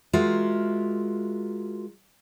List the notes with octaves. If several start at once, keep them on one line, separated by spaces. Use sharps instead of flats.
G#3 F4 F#4 A#4 E5